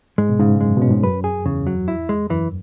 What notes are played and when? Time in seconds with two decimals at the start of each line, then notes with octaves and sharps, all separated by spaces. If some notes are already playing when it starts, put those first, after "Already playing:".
0.18 G#2 G#3
0.29 B2
0.39 G#2 C#3
0.60 F#2 G#3
0.77 B2
0.82 C#4
0.90 G#2
1.03 F#2 B4
1.24 G#4
1.46 E2 C#3
1.67 F#3
1.88 E4
2.09 G#3
2.30 F#2 E3